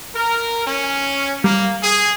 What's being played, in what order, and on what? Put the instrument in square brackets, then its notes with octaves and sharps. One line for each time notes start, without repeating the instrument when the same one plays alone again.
[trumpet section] A#4
C#4
[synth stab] G3 [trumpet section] A#3
[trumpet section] G#4